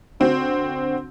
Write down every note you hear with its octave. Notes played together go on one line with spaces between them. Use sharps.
D3 C4 F#4